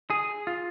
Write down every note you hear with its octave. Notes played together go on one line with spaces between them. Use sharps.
G#4
F4